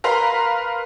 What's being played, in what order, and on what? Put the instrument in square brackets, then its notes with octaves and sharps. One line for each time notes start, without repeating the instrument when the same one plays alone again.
[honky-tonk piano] A#4 B4 F5 A#5 C6